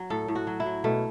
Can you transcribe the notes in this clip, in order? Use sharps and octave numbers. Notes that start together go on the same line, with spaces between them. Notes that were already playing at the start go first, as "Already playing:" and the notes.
Already playing: F#3
A2 A4
A2
F#4
F#3
E4
F#3
B2 A3